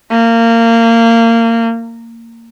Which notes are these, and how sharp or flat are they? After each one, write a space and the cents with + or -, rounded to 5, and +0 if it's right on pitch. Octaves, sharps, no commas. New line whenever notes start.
A#3 -25